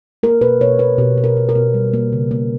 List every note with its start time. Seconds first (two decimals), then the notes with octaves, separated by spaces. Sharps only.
0.23 A#3 A#4
0.41 B2 B4
0.61 B2 C#5
0.79 A#3 B4
0.98 B2 G4
1.18 B2
1.24 A#4
1.37 B2
1.49 A#4
1.55 B2
1.74 G3
1.93 A#3
2.12 C#3
2.31 A#3